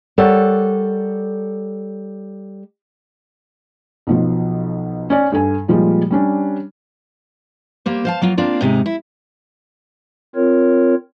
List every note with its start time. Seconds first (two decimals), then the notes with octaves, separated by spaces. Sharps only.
0.18 G3 A4 A#4 C#5 F#5
4.07 B1 B2 F3
5.10 C#4 D5
5.32 G2 A4 G#5
5.68 A#2 F3 G3 G#3 F4
6.11 G3 C#4 D4
7.86 G3 A#3 C5
8.05 C5 F5 A5
8.22 F#3 A#3 F4
8.37 A#3 C4 D4 F4
8.61 G#2 C3 G#3 D#4
8.86 E4
10.36 C4 F4 A#4 C#5